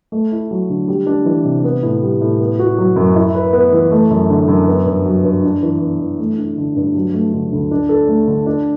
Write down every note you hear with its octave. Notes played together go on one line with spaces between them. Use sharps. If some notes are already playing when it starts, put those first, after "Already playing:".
A3
E4
F#3
D3
G3
D4
E3
C3
B3
A2
G3
A2
B3
F#4
F#3
F#2
E4
B4
B3
E3
A3
F#2
D3
F#2
B3
G2
F#3
G2
D4
E3
B3
E3
A3
D4
D3
G2
F#3
A3
D3
D2
D4
A4
A3
D3
D4